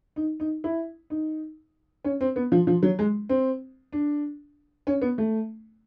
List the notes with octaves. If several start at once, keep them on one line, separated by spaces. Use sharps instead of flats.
D#4
D#4
E4
D#4
C#4
C4
B3
F3
F3
F#3
G#3
C4
D4
C#4
B3
A3